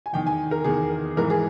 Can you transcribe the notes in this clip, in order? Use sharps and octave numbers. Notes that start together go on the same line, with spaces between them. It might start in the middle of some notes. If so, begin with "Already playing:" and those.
G#5
E2 D#3 G5
G#5
A#4
E2 D#3 G#4
G#2 E3 A#4
G#4